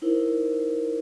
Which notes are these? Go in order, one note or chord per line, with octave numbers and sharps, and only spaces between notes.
D#4 E4 A#4 C5